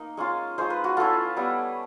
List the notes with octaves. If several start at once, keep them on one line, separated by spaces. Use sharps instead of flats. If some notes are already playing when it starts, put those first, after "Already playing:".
Already playing: A#3 D#4
G#3 C#4 F4
G#3 C#4 F4 C5
B4
F#4
A3 C#4 E4 F4
G3 B3 E4